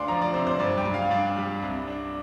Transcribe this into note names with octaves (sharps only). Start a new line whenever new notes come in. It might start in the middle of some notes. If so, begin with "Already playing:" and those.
Already playing: D2 D4 D5 F5 C6
F3 A#5
D5
C3 C5
C5
G2 D5
G5
G2
F5
D4 D5
G3
C2
D4